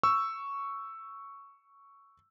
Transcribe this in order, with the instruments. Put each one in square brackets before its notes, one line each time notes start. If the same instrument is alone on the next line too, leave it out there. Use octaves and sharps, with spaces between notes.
[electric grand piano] C#6 E6